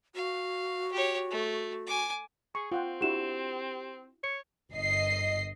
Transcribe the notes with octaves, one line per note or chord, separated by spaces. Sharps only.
F#4 F5
G4 C#5
A3
G#5 D6
G#4 C#6
C4 F4 F#5 G5
D4 E4 F#4 G4 E7
C#5 C#7
G1 D#5 C7